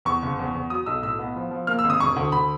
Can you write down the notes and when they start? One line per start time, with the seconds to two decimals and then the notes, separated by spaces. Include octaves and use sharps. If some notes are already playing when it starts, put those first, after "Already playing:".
0.05 E2 C#6
0.22 F#1
0.39 E2
0.55 E2
0.70 F#3 D#6
0.86 B1 E6
1.02 A2 E6
1.19 B3
1.36 F3
1.51 F3
1.67 A#3 F6
1.79 E6
1.85 G#1
1.90 D#6
2.00 E1 C#6
2.16 D2
2.32 D2 B5